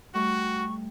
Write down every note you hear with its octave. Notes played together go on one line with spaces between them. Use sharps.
G3 A3 F#4 A4 C#6